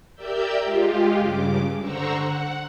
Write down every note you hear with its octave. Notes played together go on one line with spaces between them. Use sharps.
G4 A#4 D5 E5 E6 G6
G#3 F4 G4
G2 C#3 D6
D3 C5 F#5 A#5 C#6 E6
F#5